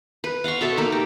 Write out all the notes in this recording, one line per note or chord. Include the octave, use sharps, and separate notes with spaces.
B4
F5 F#5 C6 C#6
B2 A4 E5 A5
A#3 D#4
G4